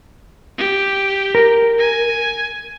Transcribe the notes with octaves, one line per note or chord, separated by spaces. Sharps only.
G4
A#4
G#5